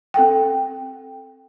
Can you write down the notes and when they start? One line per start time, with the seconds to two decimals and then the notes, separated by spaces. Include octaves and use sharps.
0.14 C4 A4 F#5 G5